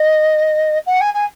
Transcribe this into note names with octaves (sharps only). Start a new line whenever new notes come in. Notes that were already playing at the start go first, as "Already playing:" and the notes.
Already playing: D#5
F#5
G#5
G#5